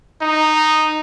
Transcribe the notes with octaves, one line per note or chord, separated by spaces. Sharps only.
D#4